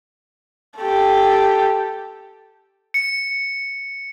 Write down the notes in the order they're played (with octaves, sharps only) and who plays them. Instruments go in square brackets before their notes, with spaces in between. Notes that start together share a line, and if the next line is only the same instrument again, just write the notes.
[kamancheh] G4 A4
[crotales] C#7